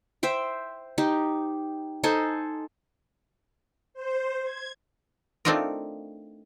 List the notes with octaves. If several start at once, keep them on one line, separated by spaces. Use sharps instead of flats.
C5 E5 G5
D#4 G4
D#4 A4 C5 G#5
C5
G#6
A3 C4 D4 D#4 F4 A#4